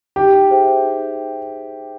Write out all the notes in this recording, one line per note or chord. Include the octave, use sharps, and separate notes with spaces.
D#4 G4
G#4 C5 E5 G5
D#4